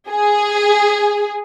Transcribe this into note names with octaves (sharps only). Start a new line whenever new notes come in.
G#4